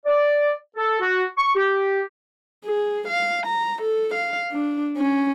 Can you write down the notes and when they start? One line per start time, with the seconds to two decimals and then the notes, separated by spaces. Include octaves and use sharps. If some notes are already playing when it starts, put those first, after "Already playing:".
0.06 D5
0.77 A4
1.00 F#4
1.38 C#6
1.56 G4
2.66 G#4
3.08 F5
3.46 A#5
3.81 A4
4.14 F5
4.52 D4
4.97 C#4